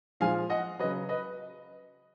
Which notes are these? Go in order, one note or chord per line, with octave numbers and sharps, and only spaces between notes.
A#2 F3 G#3 F5 G#5
D#5 F#5
C#3 F#3 B4 D#5
B4 D#5